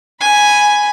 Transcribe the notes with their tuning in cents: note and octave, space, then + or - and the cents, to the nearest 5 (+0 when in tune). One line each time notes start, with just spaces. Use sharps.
G#5 +0 B5 +0